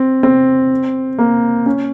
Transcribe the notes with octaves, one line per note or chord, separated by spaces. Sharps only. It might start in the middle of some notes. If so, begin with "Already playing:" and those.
Already playing: C4
C4
A#3
C#4